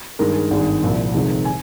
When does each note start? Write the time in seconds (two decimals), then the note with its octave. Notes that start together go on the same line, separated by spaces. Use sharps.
0.19 G2 D#3 G#3 A#4
0.33 G#4
0.50 G#1 G2 D#3 G#3
0.59 G#4
0.83 C2 A#2 F3
1.14 F1 F2 C3 D#3 G#3
1.45 G#5